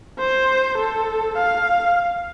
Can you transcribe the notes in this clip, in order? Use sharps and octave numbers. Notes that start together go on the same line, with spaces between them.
C5
A4
F5